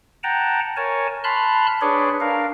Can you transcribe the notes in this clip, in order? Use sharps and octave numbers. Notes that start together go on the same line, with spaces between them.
F#5 G5 A5 A#5
A#4 C#5 G#5 A5
A5 B5 C6 F6 F#6
D4 G#4 B4 C#5 D5
D4 A#4 F5